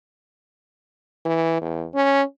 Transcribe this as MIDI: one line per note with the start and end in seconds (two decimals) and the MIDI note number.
1.25 1.59 52
1.61 1.85 40
1.94 2.22 61